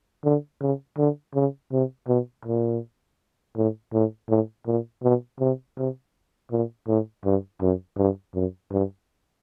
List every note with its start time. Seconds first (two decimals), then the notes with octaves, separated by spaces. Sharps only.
0.24 D3
0.61 C#3
0.97 D3
1.35 C#3
1.72 C3
2.08 B2
2.45 A#2
3.56 A2
3.93 A2
4.29 A2
4.67 A#2
5.03 B2
5.40 C3
5.77 C3
6.51 A#2
6.87 A2
7.25 G2
7.61 F#2
7.97 G2
8.35 F#2
8.72 G2